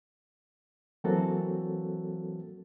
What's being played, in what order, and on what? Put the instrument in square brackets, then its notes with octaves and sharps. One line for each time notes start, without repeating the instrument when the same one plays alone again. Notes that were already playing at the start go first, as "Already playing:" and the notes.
[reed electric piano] E3 F#3 A#3 C4 F#4 A4